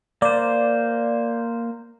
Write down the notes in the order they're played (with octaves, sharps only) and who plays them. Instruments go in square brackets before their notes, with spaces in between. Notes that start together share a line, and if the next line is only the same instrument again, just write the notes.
[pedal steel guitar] A#3 C5 [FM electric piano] D5